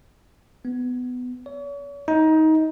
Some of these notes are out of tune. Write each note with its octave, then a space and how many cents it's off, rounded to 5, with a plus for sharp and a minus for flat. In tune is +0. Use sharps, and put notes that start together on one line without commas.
B3 +15
C#5 +40
D#4 +20